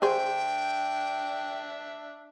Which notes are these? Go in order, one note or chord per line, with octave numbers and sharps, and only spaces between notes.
D3 D4 G#4 C5 E5 G5